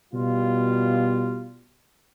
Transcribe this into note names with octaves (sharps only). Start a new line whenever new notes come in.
B2 G3 F4